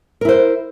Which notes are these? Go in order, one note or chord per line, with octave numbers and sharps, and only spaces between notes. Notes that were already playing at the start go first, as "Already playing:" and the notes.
E4 A#4 C5